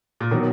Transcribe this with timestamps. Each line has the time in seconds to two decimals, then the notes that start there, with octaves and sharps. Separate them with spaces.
0.20 A#2
0.31 B2 D#3 F#3